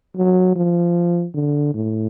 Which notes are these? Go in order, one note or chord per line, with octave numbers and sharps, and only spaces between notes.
F#3
F3
D3
A2